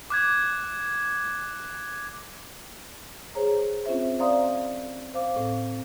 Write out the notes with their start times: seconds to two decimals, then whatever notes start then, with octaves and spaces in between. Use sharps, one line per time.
0.10 D6 F#6 G#6
3.35 G#4 C5 C#5 A#5
3.86 C4 C#4 F4 C5 E5
4.19 C5 D5 F5 A#5 C6 D#6
5.14 C5 F5 D6
5.36 A2 C4